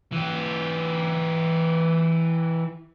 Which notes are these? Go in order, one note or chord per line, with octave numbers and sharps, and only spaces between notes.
E3 G4